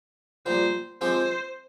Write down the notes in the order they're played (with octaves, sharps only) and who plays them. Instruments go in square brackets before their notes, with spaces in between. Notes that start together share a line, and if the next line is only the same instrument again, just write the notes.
[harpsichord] A#1 A#2 G3 [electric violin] C5
[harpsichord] F3 G#3 C4 G4 [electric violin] C5